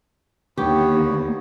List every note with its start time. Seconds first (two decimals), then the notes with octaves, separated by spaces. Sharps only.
0.58 D#2 D3 D#3 A#3 B3 G4 C#5